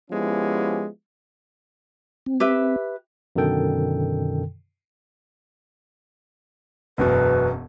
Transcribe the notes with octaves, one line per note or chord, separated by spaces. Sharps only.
F3 G#3 B3 C#4 E4 G4
C4
G4 B4 E5
F#2 B2 D3 D#3 A4 G5
E1 F#2 B2 B4